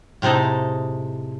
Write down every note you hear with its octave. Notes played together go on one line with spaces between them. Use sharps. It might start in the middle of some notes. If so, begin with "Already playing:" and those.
A2 C3 G#3 D#4 A4